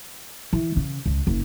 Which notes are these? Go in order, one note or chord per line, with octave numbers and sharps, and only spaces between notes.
E3
C#3
C#2
F#1